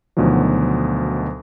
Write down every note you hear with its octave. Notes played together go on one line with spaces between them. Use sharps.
D2 B2 D#3 F3 F#3